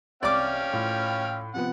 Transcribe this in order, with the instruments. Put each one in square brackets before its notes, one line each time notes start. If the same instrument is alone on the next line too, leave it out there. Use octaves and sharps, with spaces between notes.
[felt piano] C2 [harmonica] C#4 F5 G5 [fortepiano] D5 D6
[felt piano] A2 F4
[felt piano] C3 F3 B3 [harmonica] F#5